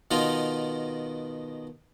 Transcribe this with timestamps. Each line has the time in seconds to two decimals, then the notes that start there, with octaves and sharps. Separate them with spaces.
0.11 B2 D#3 B3 D#4 F4